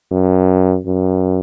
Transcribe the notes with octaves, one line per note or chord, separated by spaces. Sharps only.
F#2
F#2